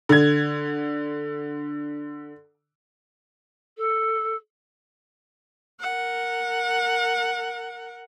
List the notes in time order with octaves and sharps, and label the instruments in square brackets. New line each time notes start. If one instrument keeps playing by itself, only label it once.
[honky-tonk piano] D3 G#6
[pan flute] A4
[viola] A#4 F#5